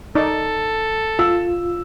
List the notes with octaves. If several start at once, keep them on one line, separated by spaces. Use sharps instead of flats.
D#4 A4 D5
F4 E6